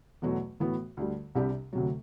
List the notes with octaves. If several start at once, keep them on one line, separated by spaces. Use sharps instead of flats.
E2 B2 F#3 A3
A2 E3 B3 F#4
D2 D3 G3
C2 C3 G3 D4 G4
D2 C3 F#3